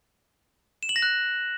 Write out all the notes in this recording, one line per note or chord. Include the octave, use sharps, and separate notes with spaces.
E7
F#7
A#6
F#6